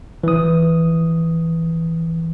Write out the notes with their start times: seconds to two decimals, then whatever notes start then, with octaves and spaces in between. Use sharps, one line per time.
0.24 E3 D#6